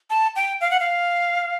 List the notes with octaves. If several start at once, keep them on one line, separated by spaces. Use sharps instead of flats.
A5
G5
F5
F#5
F5